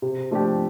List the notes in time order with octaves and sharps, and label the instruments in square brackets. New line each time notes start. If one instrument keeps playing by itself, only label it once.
[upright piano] C3
F3 A3 D4 G4